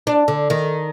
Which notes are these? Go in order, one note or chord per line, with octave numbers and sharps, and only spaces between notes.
D4
D3
D#3